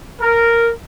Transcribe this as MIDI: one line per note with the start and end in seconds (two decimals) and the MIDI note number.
0.21 0.71 70